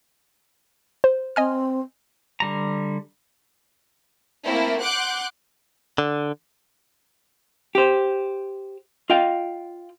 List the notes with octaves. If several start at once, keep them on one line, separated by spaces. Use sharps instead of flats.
C5
C4 D#5 G#5 F6
D3 G3 A#5
A3 A#3 C4 E4
F#5 C6 D6 F#6 G6
D3
G4 C5
F4 D#5 F5 G5